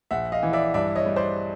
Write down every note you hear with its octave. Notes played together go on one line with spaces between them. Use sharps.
A#1 E5 F#5
D#5 F5
E3
D5 E5
G2 D5 E5
C#5 D#5
G3
C5 D5